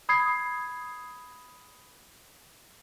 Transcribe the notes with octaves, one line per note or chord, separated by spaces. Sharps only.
B5 D#6 G#6 C7